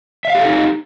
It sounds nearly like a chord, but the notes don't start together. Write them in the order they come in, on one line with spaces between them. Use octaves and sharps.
E5 F5 G4 A4 D#4